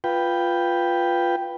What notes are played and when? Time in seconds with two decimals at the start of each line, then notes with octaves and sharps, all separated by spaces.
0.04 F4 B4 G5